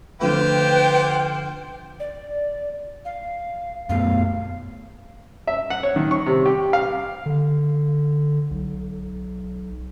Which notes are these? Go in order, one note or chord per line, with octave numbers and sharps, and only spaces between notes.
D3 F3 A3 F4 G4 B4 C5 G5
D5
F5
F#2 A3 B3 F5
E5
F#5
C#5
D#3
C#6
C3
G4
F5
D3
B1